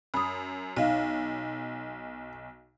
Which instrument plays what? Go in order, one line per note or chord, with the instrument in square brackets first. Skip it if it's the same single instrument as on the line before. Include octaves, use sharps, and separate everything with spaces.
[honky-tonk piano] F#2 [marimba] B5 D#6
[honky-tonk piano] B1 [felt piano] D#4 [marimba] D#5 F5